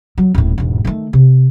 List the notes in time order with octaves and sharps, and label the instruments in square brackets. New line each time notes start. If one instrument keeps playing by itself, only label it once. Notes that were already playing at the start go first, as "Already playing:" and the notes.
[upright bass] F#3
D#1 A2
E1 G#2
D#3 A3
C3